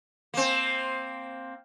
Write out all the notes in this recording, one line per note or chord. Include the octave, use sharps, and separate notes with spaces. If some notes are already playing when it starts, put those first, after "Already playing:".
A#3 C4